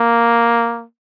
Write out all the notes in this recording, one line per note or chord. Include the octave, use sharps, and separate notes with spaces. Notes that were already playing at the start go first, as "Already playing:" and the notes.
Already playing: A#3